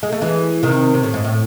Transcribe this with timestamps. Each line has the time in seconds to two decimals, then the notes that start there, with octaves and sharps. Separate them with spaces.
0.03 G#3
0.12 A3
0.21 E3 G#3
0.63 C3 D#3
0.94 C3
1.03 A2
1.14 G#2
1.24 A2